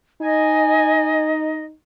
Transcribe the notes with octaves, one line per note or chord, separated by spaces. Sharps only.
D#4 D#5 G#5